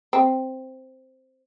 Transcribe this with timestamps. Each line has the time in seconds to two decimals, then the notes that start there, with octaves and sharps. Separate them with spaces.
0.13 C4